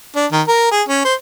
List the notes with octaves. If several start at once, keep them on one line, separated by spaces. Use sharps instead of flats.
D4
D#3
A#4
G#4
C#4
C5